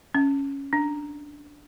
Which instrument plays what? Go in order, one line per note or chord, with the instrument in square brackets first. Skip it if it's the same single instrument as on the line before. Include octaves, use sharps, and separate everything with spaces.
[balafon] C#4
D4